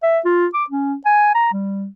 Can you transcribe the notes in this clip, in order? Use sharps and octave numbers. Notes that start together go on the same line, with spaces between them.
E5
F4
D6
C#4
G#5
A#5
G3